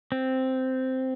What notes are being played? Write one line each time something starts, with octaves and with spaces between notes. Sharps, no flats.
C4